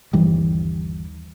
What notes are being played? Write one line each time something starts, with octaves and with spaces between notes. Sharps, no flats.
G1 D#2 E3 G3